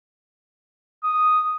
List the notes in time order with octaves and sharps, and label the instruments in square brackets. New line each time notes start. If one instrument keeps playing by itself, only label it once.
[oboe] D#6